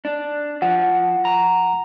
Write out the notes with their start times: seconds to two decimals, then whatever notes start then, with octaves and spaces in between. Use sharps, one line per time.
0.05 D4
0.62 F3 F#5
1.25 A#5